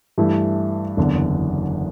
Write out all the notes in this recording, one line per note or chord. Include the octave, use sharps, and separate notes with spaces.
G2 E3 A3 E4
F#1 E2 D3